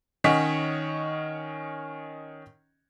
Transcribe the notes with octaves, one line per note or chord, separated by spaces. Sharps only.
D#3 C#4 C#5 D#5 F#5 B6